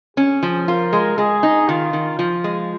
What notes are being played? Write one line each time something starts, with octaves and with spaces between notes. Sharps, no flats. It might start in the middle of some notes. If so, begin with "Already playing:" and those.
C#4 G#4
F3
F4 A#4
G#3
G#3 G#4
D#4
D#3 F4
D#3
F3 F4
G#3